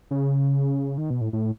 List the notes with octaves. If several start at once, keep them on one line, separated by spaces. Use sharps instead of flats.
C#3
D#3
B2
A2
A2